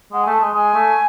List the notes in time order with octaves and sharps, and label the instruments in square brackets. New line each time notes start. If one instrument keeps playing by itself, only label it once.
[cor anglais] G#3 [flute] F#5
[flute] G#5
[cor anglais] A3
[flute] A5
[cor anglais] G#3 [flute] G#5
[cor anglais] G#3 [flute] G#5
[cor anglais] A3